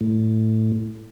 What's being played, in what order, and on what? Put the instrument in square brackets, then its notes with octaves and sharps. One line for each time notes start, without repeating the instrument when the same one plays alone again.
[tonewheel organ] A2